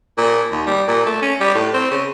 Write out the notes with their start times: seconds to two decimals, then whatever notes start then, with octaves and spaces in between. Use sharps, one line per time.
0.18 A#2
0.52 D#2
0.66 G3
0.87 A#2
1.06 A3
1.22 C#4
1.40 G3
1.55 A2
1.74 C4
1.91 C#3